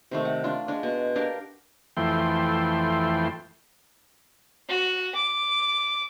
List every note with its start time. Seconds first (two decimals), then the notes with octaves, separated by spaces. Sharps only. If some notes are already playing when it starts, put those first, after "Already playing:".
0.11 C3 D#3 A3
0.25 F#5
0.44 D4 F4
0.68 G#3 D4
0.83 B2
1.15 D4 G4 A#4 F5
1.97 F2 E3 A3 G5 C6
4.69 F#4
5.15 D6